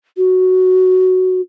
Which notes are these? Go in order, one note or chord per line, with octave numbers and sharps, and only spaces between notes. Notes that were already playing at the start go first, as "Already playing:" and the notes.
F#4